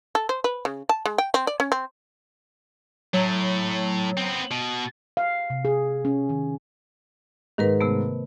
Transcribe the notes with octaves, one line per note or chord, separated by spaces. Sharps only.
A4
C5
B4
C#3
A5
G#3
G5
C4
D5
C#4
C4
A2 F#3 A3
B3 C4
B2
F5
C3
G#4
C#4
D#3
G#2 D#3 A#4 B4
C3 A3 B3